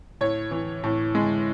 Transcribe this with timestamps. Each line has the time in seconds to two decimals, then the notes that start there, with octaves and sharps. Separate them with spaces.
0.21 A2 C#5
0.51 E3
0.84 A2
1.15 G#3